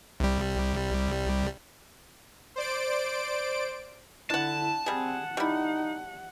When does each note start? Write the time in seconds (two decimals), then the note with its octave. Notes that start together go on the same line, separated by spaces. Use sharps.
0.20 C2 G3
2.56 C5 D5 D7
4.30 D3 D4 E4 F#5 A5
4.86 G3 C4 G#4 F#5
5.37 G3 D#4 E4